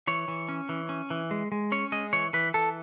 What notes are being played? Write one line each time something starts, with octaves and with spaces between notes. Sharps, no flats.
E3 C#5
E3
C#4
E3
C#4
E3
G#3
G#3
C#4 C#5
G#3 D#5
E3 C#5
E3 B4
E3 A4